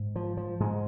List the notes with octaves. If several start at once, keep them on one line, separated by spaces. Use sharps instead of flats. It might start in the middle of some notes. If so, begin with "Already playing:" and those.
Already playing: G#2
F3
F3
G#2 G#3